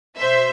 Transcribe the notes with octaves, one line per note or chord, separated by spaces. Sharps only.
B2 C5 E5